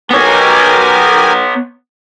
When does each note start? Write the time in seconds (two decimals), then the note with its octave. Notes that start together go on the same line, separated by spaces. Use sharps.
0.11 B3 G4 A#4 C#5 G#5